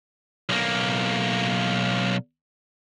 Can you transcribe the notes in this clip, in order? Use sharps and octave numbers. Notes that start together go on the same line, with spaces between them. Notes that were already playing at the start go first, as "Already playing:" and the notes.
B1 A#3